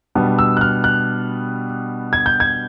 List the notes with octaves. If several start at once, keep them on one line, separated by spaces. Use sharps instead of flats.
B2 G3 B3 D4
E6
F#6
F6
F#6
G#6
G6
G#6